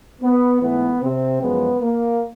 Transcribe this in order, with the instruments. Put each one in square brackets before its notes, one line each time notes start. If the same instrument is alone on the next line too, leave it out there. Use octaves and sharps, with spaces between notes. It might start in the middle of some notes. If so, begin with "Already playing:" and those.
[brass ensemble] B3
G#2 E3 A3 B3
C3 C4
F#2 C#3 F3 G#3 B3
A#3